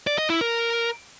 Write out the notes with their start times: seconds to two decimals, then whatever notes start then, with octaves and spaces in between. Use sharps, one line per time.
0.07 D5
0.18 D#5
0.30 E4
0.41 A#4